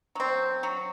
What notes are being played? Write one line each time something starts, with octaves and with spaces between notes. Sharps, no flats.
F#3 C4
F#3